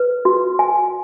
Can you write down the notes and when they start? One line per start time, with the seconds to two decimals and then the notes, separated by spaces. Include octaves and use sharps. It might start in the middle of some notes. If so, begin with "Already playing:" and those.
Already playing: B4
0.25 F#4
0.59 G#5